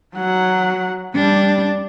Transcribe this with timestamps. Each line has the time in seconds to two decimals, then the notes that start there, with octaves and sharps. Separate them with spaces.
0.15 F#3 F#5
1.16 G3 D4